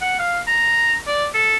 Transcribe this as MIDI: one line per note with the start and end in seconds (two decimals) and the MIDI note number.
0.01 0.16 78
0.19 0.38 77
0.47 0.96 82
1.07 1.26 74
1.34 1.57 69